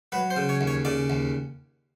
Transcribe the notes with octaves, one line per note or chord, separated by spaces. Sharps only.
F#3 B4
C5
C#3
C#5
D#2
C#5
C#3 D5
D#2